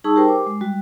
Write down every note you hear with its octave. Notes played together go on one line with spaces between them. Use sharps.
G3 D#4 G#4 A5 C#6 E6
G4 A#4 C5 G5
D6
G#3
G3 F#4